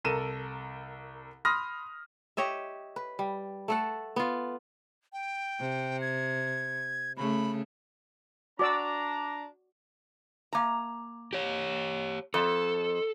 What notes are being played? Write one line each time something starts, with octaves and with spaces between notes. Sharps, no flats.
C2 A4 A#4 D#7 E7
B5 C6 D#6 F6 A#6
G4 C#5 D#5 E5
B4
G3
A3 A4 F#5
B3 F4
G5
C3
G#6
C#3 A3 B5
D4 F#4 D5 A#5 D6 E6
A#3 A#5
G4 C#5
F2 A4